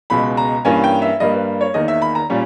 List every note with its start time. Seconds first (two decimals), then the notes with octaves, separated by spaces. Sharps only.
0.10 C#2 B2 G#3 B5
0.37 A#5
0.65 G2 E3 A#3 C#4 G#5
0.84 G5
1.02 E5
1.20 G2 G3 A#3 D#5
1.34 B4
1.61 C#5
1.74 E2 D#3 A#3 D#5
1.88 E5
2.02 B5
2.15 A#5
2.30 A#2 G3 C#4